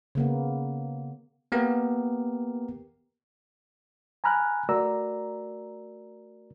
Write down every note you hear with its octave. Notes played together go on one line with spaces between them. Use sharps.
C#3 A#3 B3
A#3 B3 G4 A#4
G#5 A#5 B5 F6 F#6
A3 F#4 A#4 D5 A#5 E6